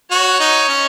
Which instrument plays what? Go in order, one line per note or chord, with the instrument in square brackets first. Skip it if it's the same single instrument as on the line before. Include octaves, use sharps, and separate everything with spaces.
[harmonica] F#4 [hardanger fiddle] C#5
[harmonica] D#4
C#4